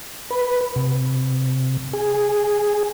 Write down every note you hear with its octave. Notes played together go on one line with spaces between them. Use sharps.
B4
C3
G#4